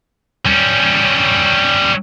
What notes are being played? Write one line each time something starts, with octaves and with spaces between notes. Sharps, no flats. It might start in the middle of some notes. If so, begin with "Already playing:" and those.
G3 C#4